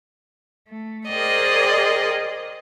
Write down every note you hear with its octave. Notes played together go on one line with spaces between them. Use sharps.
A3
G#4 A#4 C5 D5 D#5 G5